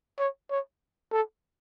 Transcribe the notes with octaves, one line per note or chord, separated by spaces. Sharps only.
C#5
C#5
A4